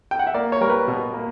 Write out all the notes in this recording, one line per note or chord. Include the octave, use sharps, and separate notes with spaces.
G5
F#5
E5
A#3 D5
C#5
G3 A#4
B4
B2
A#3